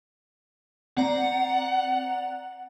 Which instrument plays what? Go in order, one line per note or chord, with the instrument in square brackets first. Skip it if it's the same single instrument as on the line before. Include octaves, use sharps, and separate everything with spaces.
[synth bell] C4 D5 A#5 [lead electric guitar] F#5